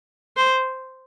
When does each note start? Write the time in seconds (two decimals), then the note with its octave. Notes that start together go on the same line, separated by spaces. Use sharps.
0.37 C5